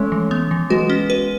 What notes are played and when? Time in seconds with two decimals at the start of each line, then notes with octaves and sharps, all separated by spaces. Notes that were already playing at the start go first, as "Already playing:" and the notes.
Already playing: G#3 A3 C#4
0.12 E3
0.31 B3
0.51 E3
0.70 G#3 B3 F#4
0.90 C#4
1.10 B4